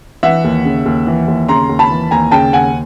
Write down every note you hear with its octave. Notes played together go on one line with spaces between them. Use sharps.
E3 E5 F#5
D#2
C#3
D#2
E3
D#2
C#3 A#5 C6
D#2
A5 B5
E3
D#2 G#5 A#5
C#3 G5 A5
D#2 F#5 G#5